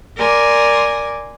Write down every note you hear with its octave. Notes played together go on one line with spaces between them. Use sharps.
A#4 D5 G#5 C6 D6